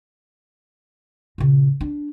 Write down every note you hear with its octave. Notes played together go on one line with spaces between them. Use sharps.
A#2 C#3
D4